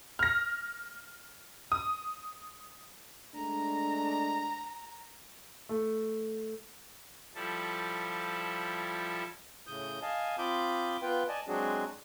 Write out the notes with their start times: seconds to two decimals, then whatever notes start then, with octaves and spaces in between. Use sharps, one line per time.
0.19 F6 A#6
1.72 D#6
3.35 G#3 A3 D4 A#5
5.69 A3
7.35 F3 G3 E4 A4
9.67 A2 C#3 D#6 G6
10.02 D#5 F5 G#5 A5 D#6
10.38 C4 F4 B5 D6 D#6 G6
11.02 B3 F4 B4 G5
11.28 D5 D#5 G#5 A5
11.48 F#3 G#3 C4 D4 F#4 G#4